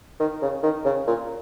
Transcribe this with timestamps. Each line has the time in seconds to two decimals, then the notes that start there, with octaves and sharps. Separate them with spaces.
0.20 D#3
0.42 C#3
0.63 D#3
0.85 C#3
1.07 A#2